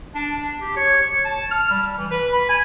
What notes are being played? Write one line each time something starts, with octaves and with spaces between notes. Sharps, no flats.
D4
D4
G4
C#5
C#5
A5
F6
G3
E3
B4
B5
G#5